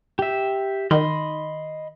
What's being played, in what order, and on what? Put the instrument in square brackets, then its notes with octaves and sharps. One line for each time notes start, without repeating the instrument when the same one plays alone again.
[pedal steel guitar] G4 E5
[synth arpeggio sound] D#3 [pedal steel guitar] D#5 B5 C6